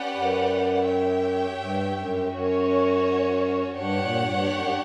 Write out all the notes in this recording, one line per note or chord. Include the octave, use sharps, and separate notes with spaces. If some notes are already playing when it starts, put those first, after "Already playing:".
Already playing: C#4 G4 B4 D5 F#5
F#2
G4 C#5 E5 G5
G2
F#2
F#2 C#4 F#4 C#5
G2 D4 G4 C#5 F#5
A#2
G2
F#2